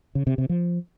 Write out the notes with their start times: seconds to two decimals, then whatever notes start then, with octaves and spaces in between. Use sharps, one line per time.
0.15 C#3
0.27 C3
0.38 C3
0.49 F3